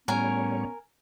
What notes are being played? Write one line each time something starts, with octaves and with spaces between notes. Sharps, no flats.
A2 G3 B3 C#4 A#4 C#5 G#5